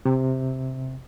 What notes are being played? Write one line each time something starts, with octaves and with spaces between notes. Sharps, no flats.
C3